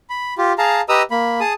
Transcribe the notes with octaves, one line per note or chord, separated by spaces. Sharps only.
B5
F4 G4
G#4 F5 A5 A#5
G4 B4 D#5 A#5 D#6 E6
A#3 B5
G#4 A5 D#6